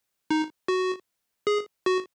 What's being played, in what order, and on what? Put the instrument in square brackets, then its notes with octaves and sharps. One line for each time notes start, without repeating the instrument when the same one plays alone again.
[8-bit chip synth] D#4
F#4
G#4
F#4